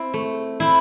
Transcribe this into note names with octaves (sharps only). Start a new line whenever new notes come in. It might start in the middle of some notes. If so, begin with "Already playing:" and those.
Already playing: C4 E4
A3
C4 E4